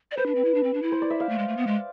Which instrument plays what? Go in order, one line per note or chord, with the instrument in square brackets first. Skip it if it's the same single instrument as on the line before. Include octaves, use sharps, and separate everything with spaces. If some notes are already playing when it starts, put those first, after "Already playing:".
[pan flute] D5
[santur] B4 [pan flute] C5
[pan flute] D4
C4
E4
D4
C4
D4
E4
[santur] C5
D5
E5
F5
[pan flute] A3
G#3
A3
B3
G#3